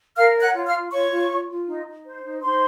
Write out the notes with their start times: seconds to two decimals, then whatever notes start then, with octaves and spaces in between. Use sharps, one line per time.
0.16 A#4 F5 F6
0.35 C#5
0.41 F#5 F#6
0.54 F4
0.66 F5 F6
0.73 F4
0.91 F4 C#5 C#6
1.10 F4
1.30 F4
1.49 F4
1.67 D#4
1.86 D#4
2.05 C5
2.23 D#4
2.42 D#4 C5 C6